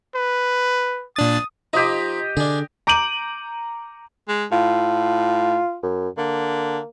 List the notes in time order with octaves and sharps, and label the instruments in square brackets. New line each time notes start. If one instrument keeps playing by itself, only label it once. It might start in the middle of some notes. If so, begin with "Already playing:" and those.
[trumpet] B4
[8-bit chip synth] A#2 D4 A6 [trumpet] D#6
[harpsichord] F3 D#4 [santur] G4 D#5
[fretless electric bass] D3 [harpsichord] D4 G#4
[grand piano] A#5 D6 G6 D7 D#7 F#7
[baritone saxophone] G#3
[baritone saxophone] A2 [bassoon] F4
[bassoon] F#2
[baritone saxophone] D3 [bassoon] A#3